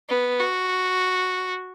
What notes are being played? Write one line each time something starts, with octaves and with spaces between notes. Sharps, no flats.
B3
F#4